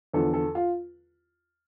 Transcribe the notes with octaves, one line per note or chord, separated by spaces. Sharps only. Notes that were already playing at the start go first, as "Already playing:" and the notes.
E2 D3 F3 A4
A4
F4